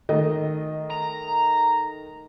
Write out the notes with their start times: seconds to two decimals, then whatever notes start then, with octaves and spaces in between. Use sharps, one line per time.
0.09 D#3 A3 D#5
0.90 A#5